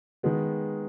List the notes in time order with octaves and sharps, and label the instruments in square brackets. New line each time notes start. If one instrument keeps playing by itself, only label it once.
[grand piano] D#3 G#3 B3